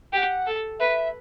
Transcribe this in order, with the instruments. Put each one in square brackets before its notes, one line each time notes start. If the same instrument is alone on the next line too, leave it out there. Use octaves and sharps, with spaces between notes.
[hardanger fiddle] G4 [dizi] F#5 G5
[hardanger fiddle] A4
[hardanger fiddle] B4 [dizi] E5